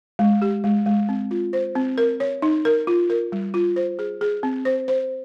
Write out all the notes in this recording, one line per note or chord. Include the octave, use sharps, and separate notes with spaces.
G#3
G4
G#3
G#3
C4
F4
C5
C4
A#4
C#5
D#4
A#4
F4
A#4
G3
F4
C5
G#4
G#4
C4
C5
C5